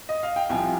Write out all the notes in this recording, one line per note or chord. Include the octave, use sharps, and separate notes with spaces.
D#5
F5
G5
C2 C3 F3 G#5